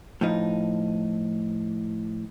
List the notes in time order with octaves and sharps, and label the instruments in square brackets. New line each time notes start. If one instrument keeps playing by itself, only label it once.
[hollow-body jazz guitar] A2 F3 D#4